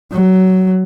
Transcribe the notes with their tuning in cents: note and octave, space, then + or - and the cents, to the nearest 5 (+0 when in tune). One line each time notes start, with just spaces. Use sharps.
F#3 +15